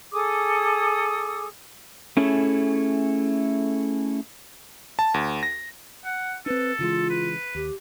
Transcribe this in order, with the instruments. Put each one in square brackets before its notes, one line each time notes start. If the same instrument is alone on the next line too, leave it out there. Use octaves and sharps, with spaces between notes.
[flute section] G#4 A4 D6 D#6
[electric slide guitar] A3 C#4 E4 G#4 A4
[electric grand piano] A5
D2
A#6
[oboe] F#5
[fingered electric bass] C4 D4 [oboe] A4 [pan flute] B4
[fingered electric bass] C#3 E3 G#3 [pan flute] F4
[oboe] B4
[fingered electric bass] D#2 [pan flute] G4